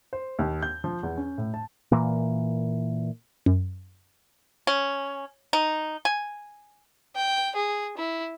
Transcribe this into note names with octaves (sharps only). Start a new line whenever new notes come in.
C5
D#2
G6
F3
E2
C#4
A2
A5
A#2 E3 A#3
F#2
C#4
D#4
G#5
G5
G#4
E4